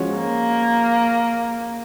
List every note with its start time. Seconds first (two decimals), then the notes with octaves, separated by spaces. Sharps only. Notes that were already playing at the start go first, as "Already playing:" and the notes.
Already playing: F3 G#3 C#4 F#4
0.16 A#3